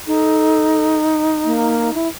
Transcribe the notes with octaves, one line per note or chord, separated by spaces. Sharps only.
D#4 A4
A#3
E4